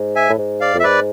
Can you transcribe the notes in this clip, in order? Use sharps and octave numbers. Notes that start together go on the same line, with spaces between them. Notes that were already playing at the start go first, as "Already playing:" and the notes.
Already playing: G#2
E5 G#5
A2
G#2
D5 F5
F2
E5
G#2 B4 D5